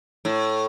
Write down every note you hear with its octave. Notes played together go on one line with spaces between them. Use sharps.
A2